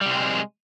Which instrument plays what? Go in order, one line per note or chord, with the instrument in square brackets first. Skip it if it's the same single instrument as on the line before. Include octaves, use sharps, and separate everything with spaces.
[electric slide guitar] G3
C3
C4
G#3